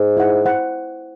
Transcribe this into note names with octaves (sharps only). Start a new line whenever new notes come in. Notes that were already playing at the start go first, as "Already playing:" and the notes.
Already playing: G#2
E4 C5 F#5
E4 C5 F#5